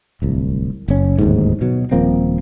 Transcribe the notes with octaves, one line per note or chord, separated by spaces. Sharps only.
D1 C2
F#1 C#4
D1 D#2 G#2
B2 F#3
D#1 F3 A#3 C4